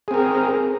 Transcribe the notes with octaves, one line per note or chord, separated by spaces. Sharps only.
C4 G#4 A#4